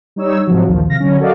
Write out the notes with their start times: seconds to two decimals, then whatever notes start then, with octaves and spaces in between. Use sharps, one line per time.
0.16 G3 D#4 C#5 E6
0.46 G#2 C3 F3 F#3
0.68 A#1 D#2 D#3 F3
0.88 C3 F5 A#6
1.00 D3 F#3 C#4
1.20 F#4 A4 A#4 D5 D#5 F5